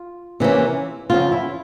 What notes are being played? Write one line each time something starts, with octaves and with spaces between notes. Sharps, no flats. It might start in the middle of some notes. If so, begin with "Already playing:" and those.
Already playing: F4
C3 E3 G3 A#3 C#4
E2 C#3 F3 C4 F4
E4